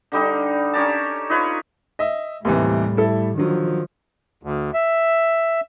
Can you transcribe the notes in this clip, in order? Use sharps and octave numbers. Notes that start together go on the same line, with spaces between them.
D3 G3 D#4
C#4 G4 A#4 A5
D#4 F4 B4 C#5
D#5 E5
D#2 A2 C3 E3 G3
E4 A4 E5
D3 D#3 F3 F#3
D2
E5